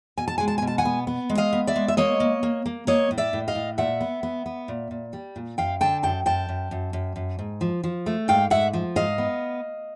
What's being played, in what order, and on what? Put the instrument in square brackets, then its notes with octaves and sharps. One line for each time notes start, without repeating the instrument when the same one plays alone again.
[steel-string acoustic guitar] B2 G#5
A5
G#3 G#5
A5
B2 G#5
A5
F#5 G#5
B3
B3
G#3
D#5 F5
B3
D5 E5
G#3
E5
A#3 C#5 D#5
A#3
A#3
A#3
A#3 C#5 D#5
A2
D5 E5
A2
D#5 F5
A2
A#2 E5 F#5
B3
B3
B3
A#2
A#2
G3
A#2
F#2 F5 G5
D3 G5 A5
F#2 G5 A5
F#2 G5 A5
F#2
F#2
F#2
F#2
G#2
F3
F3
A3
G#2 F5 G5
G#2 E5 F#5
F3
G#2 D#5 F5
B3